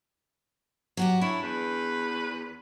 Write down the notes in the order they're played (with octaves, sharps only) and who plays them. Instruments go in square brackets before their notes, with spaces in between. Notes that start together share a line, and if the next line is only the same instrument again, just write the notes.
[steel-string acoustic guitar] F#3 F#4 G4
[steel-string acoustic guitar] D4 [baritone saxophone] E4 [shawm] C#5
[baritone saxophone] E2 [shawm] B4